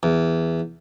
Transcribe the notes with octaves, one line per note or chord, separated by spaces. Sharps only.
E2